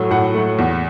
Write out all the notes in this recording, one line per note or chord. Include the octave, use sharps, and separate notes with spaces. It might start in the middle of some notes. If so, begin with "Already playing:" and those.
Already playing: A2 F#3 A3
A2 F#5
F#3 A3
E2